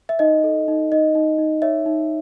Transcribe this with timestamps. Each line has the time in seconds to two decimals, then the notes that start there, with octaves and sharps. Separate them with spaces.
0.09 E5
0.19 D#4 D#5
0.44 A4
0.68 D#4
0.92 D#4 D#5
1.15 D#4
1.38 D#4
1.62 C#5 E5
1.86 D#4